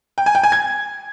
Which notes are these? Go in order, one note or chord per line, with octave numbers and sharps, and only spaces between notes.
G5
G#5
G5
G#5
G#6